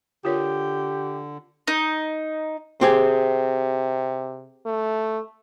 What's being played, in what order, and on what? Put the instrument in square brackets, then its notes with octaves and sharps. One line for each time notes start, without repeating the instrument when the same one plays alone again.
[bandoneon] D3 [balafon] F4 A#4 C#5 [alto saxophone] G4
[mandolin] D#4
[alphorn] C3 [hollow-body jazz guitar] C4 G4 G#4
[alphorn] A3